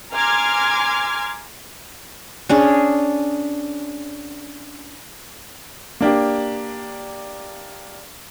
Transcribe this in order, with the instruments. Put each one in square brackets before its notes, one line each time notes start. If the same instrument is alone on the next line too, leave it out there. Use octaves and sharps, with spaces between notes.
[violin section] G#5 A#5 C6 D6 F6 G#6
[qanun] C#4 D4 G#4
[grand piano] A#3 D4 G4